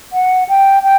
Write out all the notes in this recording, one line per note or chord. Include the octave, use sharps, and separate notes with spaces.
F#5
G5
G5